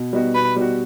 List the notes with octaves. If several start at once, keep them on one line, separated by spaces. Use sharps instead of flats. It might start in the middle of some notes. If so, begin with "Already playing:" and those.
Already playing: B2
G3 B3 D#4 F#4
B2 B4
G3 B3 D#4 F#4